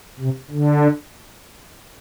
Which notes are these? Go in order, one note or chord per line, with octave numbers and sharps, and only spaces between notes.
C3
D3